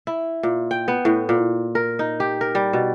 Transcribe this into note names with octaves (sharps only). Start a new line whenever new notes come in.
E4
A#2
G5
B3
A2
A#2
A#4
D#4
G4
A#4
G3
B2